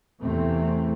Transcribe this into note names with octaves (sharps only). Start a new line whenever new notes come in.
E2 C3 E3 A3 C4